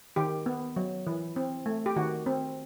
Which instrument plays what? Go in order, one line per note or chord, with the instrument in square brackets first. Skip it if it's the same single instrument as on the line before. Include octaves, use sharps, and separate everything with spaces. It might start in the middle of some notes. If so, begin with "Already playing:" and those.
[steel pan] D#3 G4
B3
F#3
E3
C4
A3
G4
D#3 F#4
C4